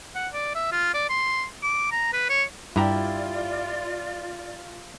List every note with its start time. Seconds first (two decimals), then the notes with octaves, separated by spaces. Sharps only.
0.15 F#5
0.33 D5
0.55 E5
0.72 F4
0.94 D5
1.09 C6
1.63 D6
1.92 A#5
2.13 B4
2.29 C#5
2.76 G2 E4 F4 G4 D5 A#5